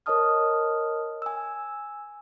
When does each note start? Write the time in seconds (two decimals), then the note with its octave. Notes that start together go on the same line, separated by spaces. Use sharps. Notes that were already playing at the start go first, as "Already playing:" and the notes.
0.06 A#4 C#5 D#5 A5 D#6 F6
1.22 G#5 E6